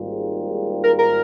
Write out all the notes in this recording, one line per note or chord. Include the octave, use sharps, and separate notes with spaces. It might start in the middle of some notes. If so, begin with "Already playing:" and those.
Already playing: G#1 G#2 G3 A#3 F4
A#4
A#4